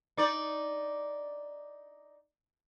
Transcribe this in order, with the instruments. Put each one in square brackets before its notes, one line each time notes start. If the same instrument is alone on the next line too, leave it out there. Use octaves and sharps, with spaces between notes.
[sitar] D#4 D5